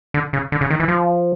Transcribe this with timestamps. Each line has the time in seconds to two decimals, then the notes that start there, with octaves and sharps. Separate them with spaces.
0.14 D3
0.33 C#3
0.52 D3
0.61 C#3
0.71 D#3
0.80 E3
0.88 F3